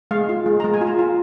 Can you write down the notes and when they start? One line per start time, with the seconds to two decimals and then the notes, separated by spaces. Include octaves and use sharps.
0.11 G#3 F5
0.29 F4
0.46 G#3
0.60 G#3 A#5
0.74 G#5
0.81 F4
0.87 A#5
0.99 F4